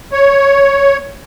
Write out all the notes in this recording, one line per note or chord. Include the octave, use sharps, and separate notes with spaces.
C#5